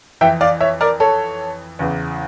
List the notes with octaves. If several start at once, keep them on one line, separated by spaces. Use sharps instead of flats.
F2 E3 E5 G5
D5 F5
C#5 E5
A#4 D5
A4 C#5
E2 C#3 E3